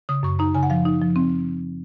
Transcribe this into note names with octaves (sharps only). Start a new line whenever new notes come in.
C#3 D#6
F#2 C#6
D#4 A#5
C#3 G#5
F#5
F3 F5
D#4
F3
C4